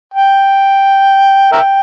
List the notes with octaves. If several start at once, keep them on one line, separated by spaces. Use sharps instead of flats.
G5
A#4 E5 G5